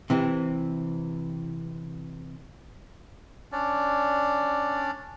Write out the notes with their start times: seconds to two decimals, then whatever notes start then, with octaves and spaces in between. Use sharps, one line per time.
0.10 C3 E3 C4
3.52 C#4 D4 D5